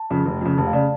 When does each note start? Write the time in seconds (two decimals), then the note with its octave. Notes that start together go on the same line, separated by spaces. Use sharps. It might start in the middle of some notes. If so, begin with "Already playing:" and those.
Already playing: A5
0.10 F2 C#3
0.26 F1
0.41 F2 C#3
0.58 F1 A5
0.67 F5
0.73 C#3 D5